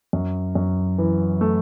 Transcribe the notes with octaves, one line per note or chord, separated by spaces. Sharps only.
F#2
F#2
E3
A3